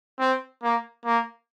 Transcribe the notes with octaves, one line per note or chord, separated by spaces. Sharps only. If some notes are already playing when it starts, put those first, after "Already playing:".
C4
A#3
A#3